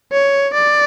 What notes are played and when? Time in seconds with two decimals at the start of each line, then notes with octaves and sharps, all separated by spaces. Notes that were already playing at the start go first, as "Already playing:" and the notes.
0.13 C#5
0.54 D5